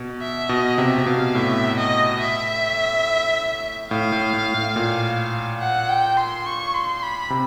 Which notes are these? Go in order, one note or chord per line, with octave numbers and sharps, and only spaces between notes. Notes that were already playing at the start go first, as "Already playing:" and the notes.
Already playing: B2
E5
B2 D#5
C3 E5
C3
B2 F5
A2 E5
D#5
E5
A2 F5
A2
A2
A2
A#2
F#5
G5
C6
C#6
C6
B5
C3